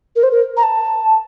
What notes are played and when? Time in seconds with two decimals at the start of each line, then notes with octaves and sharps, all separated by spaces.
0.16 A#4
0.23 C5
0.31 A#4
0.57 A#5
0.63 A5